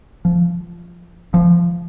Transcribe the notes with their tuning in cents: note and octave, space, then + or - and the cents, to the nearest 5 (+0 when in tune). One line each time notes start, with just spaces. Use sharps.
F3 -10
F3 -15